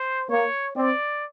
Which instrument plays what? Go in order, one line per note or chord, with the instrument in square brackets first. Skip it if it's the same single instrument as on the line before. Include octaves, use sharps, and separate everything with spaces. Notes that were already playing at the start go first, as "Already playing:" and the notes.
Already playing: [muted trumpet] C5
[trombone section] A#3 [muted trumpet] C#5
[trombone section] C4 [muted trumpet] D5